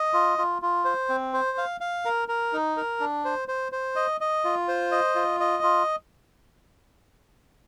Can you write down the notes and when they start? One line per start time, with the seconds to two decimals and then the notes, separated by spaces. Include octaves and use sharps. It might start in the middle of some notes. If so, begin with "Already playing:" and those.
Already playing: D#5
0.14 F4
0.38 F4
0.62 F4
0.85 C5
1.09 C4
1.33 C5
1.58 F5
1.81 F5
2.05 A#4
2.28 A#4
2.53 D#4
2.77 A#4
3.00 D4
3.25 C5
3.48 C5
3.72 C5
3.96 D#5
4.21 D#5
4.45 F4
4.68 C5
4.92 D#5
5.15 F4
5.40 D#5
5.63 F4